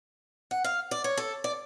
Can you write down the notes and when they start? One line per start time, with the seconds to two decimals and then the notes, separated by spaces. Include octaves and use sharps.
0.51 F#5
0.64 F5
0.91 D5
1.04 C#5
1.17 A4
1.44 D5